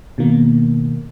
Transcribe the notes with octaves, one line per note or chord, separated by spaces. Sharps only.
B2 D#3 A#3